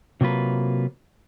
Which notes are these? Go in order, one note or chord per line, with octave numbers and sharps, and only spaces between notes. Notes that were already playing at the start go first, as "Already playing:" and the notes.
C3 F#3 A#3 F4 B4